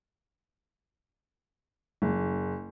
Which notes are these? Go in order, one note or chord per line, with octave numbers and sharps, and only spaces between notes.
F#1